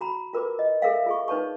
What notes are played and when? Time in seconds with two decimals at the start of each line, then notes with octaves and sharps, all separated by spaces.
0.01 F#4 A#5 B5
0.33 F4 A#4 B4 D6
0.59 D#5
0.82 G#4 A#4 E5 F5
1.06 F4 G#4 C#6
1.28 D#4 B4 C#5 A5 C#6